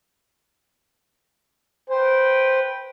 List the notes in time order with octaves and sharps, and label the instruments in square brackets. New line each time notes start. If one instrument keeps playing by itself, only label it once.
[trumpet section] B4 G5 [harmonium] C5